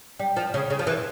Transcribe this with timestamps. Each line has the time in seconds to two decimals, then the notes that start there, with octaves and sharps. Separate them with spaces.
0.19 G3
0.36 F3
0.54 C#3
0.70 C#3
0.79 F3
0.87 E3